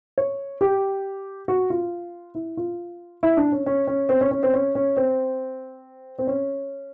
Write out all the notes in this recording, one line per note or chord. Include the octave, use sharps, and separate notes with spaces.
C#5
G4
F#4
F4
E4
F4
E4
D4
C#4
C#4
C#4
C4
C#4
C#4
C4
C#4
C#4
C4
C4
C#4